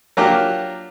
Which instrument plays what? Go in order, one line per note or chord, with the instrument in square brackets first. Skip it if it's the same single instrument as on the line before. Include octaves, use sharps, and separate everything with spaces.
[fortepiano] F#3 A#3 D4 F4 G4